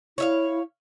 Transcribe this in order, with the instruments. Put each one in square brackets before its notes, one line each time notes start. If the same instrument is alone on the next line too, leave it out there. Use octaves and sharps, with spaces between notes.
[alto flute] E4 [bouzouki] C#5 E5 F5